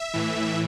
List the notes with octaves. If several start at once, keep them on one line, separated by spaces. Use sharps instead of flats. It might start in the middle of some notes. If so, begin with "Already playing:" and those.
Already playing: E5
A2 E3